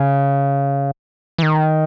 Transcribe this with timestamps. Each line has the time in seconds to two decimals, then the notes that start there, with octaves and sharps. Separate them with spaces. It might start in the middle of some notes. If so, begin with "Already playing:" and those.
Already playing: C#3
1.38 E3
1.43 D#3